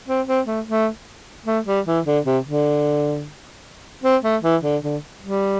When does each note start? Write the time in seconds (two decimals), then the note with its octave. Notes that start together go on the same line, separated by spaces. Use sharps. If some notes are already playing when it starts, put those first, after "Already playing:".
0.08 C4
0.27 C4
0.46 A3
0.67 A3
1.46 A3
1.66 G3
1.86 E3
2.05 D3
2.25 C3
2.44 D3
4.03 C4
4.23 A3
4.42 E3
4.63 D3
4.83 D3
5.22 G3